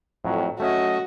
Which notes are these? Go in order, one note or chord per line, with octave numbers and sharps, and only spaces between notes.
F2 A2 F#3
F#3 A3 C#4 F#4 D#5 E5